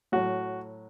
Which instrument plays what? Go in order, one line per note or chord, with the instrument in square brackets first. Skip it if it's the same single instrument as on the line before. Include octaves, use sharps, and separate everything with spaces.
[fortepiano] A2 F#3 F#4